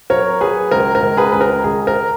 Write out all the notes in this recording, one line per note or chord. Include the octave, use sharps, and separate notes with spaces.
F#3 A#4 C#5
F#3 G#4 B4
C#2 A#4
A#4
C#2
G#4 B4
C#2 B4
A#4
C#2 G#4
A#4